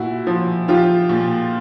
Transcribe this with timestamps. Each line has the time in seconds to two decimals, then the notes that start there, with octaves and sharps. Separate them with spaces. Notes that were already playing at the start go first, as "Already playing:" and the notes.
Already playing: A#2 E4 F#4
0.27 F3
0.68 F3 F4 G4
1.09 A#2